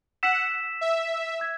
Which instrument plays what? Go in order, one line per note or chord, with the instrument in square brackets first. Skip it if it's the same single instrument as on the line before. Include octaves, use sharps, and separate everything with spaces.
[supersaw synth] F#5 [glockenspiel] E6 B6 E7
[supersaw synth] E5
[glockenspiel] E6 G#6